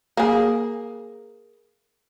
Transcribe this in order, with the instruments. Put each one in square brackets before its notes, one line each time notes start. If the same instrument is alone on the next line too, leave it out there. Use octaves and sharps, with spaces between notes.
[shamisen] A#3 G#4